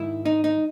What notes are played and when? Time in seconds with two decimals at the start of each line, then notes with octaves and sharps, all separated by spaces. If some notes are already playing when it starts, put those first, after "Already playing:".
Already playing: G#2 D#3 E4
0.25 D#4
0.44 D#4